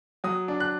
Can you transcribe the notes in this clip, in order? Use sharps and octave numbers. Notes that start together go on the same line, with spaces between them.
F#3 D#6
D4
F#6